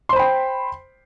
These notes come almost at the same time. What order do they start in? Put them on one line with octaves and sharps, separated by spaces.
C6 C5 B5 G5